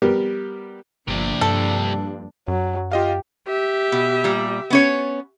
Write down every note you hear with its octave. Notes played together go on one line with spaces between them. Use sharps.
G3 B3 G4 A#4
G1 C3 F3 G3 A#3 D4
G2 A4
F#2 F#3
F4 G4 D#5 F5
G4 E5
B2
A#2 G3
B3 C#4 C#5